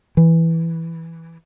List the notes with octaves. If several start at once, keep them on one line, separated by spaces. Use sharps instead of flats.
E3